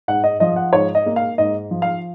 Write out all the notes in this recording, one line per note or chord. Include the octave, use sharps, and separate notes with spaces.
G#2 F#5
D#5
F3 D#5
F#5
G#2 C#5
D#5
A#3
F5
G#2 D#5
F3
F5